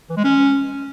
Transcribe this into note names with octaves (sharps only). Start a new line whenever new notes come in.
E3
G#3
C#4